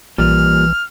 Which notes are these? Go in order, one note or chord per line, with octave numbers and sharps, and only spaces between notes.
A#1 A#2 E3 G3 F6